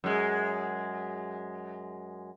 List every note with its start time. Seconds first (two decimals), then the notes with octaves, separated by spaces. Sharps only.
0.04 F#2 G#3